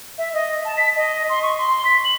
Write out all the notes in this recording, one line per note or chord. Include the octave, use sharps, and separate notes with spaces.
E5
D#5
A5
B6
D#5
C6
C#6
C6
B6
F#7